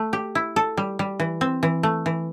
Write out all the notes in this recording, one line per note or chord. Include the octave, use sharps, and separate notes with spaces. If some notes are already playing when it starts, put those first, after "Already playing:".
Already playing: A3
G4
E4
A4
G3
G3
E3
C4
E3
A3
E3